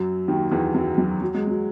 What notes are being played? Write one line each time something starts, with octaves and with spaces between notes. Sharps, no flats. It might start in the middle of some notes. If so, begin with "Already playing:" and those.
Already playing: F#2 F#3
D#2 D#3
E2 E3
F#2 F#3
F#2 F#3
F#3
G#3
F#3